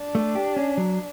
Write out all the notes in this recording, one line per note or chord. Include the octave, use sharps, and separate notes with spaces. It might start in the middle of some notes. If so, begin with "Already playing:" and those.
Already playing: D4
A3
G4
C#4
F#3